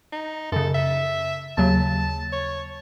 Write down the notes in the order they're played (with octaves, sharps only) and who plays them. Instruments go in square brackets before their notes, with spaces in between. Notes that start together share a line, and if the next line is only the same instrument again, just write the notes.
[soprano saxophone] D#4
[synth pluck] F#2 C#3 [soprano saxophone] A4
[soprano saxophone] E5
[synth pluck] D#2 C#3 F#3 [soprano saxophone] A5
[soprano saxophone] C#5